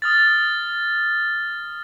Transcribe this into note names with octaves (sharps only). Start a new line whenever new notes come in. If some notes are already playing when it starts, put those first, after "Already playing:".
D#6 F6 A6